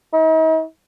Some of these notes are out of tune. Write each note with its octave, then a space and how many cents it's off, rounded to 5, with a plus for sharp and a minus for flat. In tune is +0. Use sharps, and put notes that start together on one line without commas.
D#4 +45